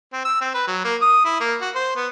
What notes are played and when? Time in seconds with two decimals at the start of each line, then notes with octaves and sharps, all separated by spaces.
0.13 C4
0.25 E6
0.41 C4
0.54 B4
0.67 F#3
0.85 A#3
1.02 D#6
1.25 E4
1.41 A#3
1.61 F#4
1.75 C5
1.96 B3